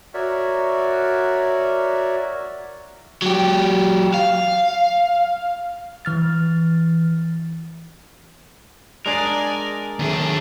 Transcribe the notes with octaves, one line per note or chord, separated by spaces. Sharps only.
F#4 A#4 C#5 D5 E5
F#3 G4
F5
E3 F6 A6
G#3 D4 G#4 A#4 D5 G#5
D#2 A3 D4 G#4